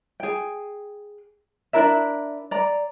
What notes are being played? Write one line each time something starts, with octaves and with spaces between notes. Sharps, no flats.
G#4 G5
D4 E4 A#4 E5
D5 A#5